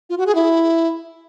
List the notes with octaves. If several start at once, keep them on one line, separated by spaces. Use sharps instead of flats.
F4
F#4
G#4
E4